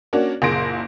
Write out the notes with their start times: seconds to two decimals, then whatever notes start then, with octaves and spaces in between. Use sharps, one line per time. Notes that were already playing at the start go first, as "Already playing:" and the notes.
0.13 A#3 C#4 D4 F#4
0.42 F#1 A#2 G#4 C6 A#6 D7